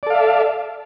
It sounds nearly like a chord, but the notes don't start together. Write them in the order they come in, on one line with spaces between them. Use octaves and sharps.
D5 A4 F5 E5